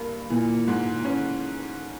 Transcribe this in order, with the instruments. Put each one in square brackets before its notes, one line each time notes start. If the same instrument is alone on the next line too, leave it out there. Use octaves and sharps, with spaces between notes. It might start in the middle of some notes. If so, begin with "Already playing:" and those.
Already playing: [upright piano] G2 A#3
[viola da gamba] A#2 [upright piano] E3
[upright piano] G#2
C#4